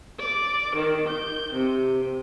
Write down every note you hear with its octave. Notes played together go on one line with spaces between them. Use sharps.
D5
D#3
G6
C3